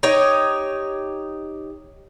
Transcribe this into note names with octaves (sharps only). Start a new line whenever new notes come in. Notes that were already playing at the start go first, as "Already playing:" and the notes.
D#4 G4 C#5 D#5